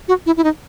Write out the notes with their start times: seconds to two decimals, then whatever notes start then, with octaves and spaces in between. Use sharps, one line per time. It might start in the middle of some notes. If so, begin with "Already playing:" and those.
0.08 F#4
0.26 E4
0.37 E4
0.44 D#4